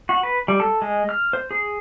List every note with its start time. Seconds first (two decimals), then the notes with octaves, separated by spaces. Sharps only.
0.09 F#4
0.23 B4
0.48 G3
0.60 A4
0.82 G#3
1.09 F6
1.33 C5
1.51 G#4